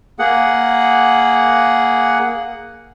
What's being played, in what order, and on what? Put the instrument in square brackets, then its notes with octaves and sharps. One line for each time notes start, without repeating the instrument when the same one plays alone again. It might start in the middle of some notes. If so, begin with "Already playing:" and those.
[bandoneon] A#3 G#4 F#5